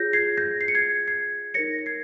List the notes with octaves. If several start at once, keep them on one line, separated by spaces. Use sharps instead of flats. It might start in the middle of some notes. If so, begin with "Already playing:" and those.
Already playing: F4 G#4 C#5 G6 A#6
G#6 C7
G6 A#6
C7
C#7
G#6 C7
G#6 C7
D#4 A#4 C#5 A#6 C#7
A#6
G#6 C7